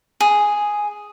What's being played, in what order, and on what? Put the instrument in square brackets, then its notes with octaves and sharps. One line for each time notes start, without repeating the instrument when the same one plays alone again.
[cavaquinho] G#4